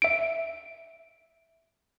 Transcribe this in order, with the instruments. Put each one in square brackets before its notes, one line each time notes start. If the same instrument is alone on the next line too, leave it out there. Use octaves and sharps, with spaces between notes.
[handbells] E5 D7